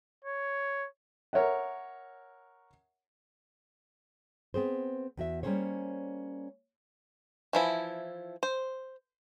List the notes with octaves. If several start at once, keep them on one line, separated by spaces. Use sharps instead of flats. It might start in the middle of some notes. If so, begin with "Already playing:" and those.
C#5
A#4 C#5 E5 F#5
B3 C4 G#4 C5
E2 F#4 E5
G3 A#3 C#4 G#4 C5 C#5
E3 F3 E4
C5